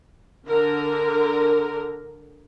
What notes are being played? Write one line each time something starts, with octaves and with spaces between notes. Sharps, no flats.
D3 A#4